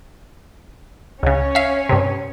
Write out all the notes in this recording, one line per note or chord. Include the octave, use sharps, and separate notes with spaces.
C#2 C#3 C#4 C#5
E5 F5
G2 C3